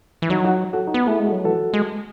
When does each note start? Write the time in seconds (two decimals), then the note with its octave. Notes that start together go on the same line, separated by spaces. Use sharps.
0.22 E3
0.30 F#3 D#4 F#4
0.44 D#4 F#4
0.73 F#4 A4
0.87 D#4 F#4
0.94 B3
1.06 A3 E4 G#4
1.20 G#3
1.25 F#4 A4
1.32 F#3
1.44 E3 F#4 A4
1.73 G#3